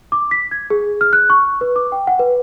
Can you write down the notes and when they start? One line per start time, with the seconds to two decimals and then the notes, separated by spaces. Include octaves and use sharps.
0.12 D6
0.31 B6
0.51 G#6
0.70 G#4
1.01 F6
1.13 F#6
1.30 C#6
1.61 B4
1.76 D6
1.92 G5
2.07 F#5
2.19 B4